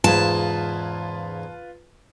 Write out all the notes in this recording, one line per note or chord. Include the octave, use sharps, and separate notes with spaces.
E2 G#2 C#3 F4 B4 A5